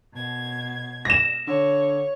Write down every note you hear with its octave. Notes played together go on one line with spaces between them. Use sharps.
B2 G#6
A#6 E7
D3 C#5